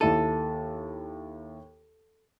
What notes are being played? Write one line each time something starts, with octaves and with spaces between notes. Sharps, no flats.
D#2 E4 A4 D#7